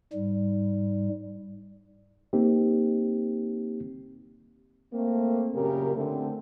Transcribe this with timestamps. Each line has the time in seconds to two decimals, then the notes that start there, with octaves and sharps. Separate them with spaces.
0.13 G#2 G3
2.33 A#3 C4 D#4 G4
4.93 A3 A#3 C4
5.55 F#2 A#2 C#3 G4 A#4
5.96 D3 A3 C4